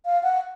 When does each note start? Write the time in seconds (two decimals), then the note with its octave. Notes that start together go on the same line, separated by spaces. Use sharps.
0.05 F5
0.23 F#5